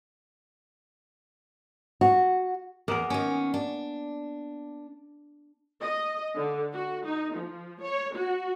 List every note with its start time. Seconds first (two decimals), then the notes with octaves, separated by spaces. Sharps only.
2.01 F#4
2.88 E2 A#3 B3 A#4
3.10 D#3 C#4
3.54 D4
5.82 D#5
6.36 D3
6.72 F#4
7.05 D#4
7.35 F3
7.80 C#5
8.14 F#4